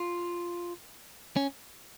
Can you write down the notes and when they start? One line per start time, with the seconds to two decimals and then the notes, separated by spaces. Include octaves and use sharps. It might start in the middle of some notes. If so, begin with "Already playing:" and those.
Already playing: F4
1.36 C#4